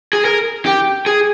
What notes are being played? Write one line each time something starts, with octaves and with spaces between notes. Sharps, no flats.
G#4
A#4
G4
G#4